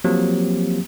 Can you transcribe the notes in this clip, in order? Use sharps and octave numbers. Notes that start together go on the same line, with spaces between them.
F3 F#3 A#3 C4 G4